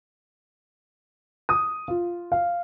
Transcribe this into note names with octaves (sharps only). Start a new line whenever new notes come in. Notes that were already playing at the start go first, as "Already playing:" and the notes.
D#6
F4
F5